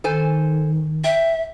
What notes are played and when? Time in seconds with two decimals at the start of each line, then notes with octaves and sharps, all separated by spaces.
0.04 D#3 A4 C5 G#5
1.04 E5 G5